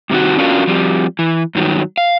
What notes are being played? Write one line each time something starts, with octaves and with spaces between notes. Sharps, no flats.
G2 C3 D#3 F#4
C#4 D4 F4 F#4 A#4
F3 G3 C4
E3
G2 D#3 F#3
F5